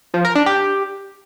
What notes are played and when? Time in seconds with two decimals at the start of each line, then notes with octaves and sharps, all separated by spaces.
0.14 F3
0.25 A#4
0.35 D4
0.46 G4